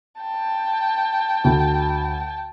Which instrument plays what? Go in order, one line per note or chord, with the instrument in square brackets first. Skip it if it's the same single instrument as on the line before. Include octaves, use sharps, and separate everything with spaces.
[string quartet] G5 A5
[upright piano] D2